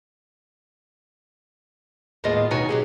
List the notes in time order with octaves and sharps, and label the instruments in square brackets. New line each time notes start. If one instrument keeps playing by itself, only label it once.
[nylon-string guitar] D#2 A2 G#3 B3 F4 D#5
B2 D#3 D#4 F#4 C#5 G#5
F#3 G4 G#4